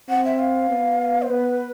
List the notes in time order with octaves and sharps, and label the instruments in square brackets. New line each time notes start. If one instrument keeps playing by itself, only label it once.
[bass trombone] C4 [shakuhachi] F#5
[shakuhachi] E5
F5
[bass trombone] B3
[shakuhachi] C5
[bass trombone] B3 [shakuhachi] B4